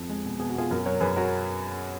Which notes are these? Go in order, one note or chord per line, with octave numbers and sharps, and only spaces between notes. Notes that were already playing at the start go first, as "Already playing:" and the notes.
Already playing: F2
G#3
B2
B2 G#4
F#4
B2 F4 G#4
F#2 F#4 A#4
F#3 A#4 C#5
F#2 G#4 B4
F#3 F#4 A#4